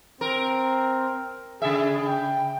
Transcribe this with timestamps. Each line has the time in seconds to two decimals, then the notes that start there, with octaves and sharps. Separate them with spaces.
0.21 C4 A#4
1.62 C#3 G#4 E5
2.07 G5